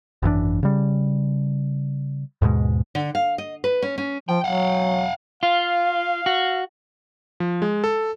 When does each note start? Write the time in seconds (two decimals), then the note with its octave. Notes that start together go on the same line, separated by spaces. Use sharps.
0.22 G#1 F#2 E3 D4
0.63 C#3 G3
2.42 D#2 G#2 B2 G#3
2.95 D3
3.15 F5
3.38 D#5
3.64 B4
3.82 C#4
3.98 C#4
4.29 F3 G5
4.44 F#3 F5 F#5
5.43 F4 F5
6.26 F#4
7.40 F3
7.62 G#3
7.84 A4